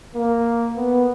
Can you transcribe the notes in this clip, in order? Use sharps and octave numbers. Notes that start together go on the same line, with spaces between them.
A#3
B3